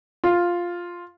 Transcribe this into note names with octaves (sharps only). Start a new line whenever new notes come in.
F4